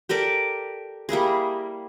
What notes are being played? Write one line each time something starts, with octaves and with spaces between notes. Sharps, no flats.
G4 A4 A#4 D5
G3 A#3 E4 G#4